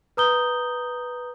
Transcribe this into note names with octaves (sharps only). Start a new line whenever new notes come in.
B4 A#5 D#6 G6 G7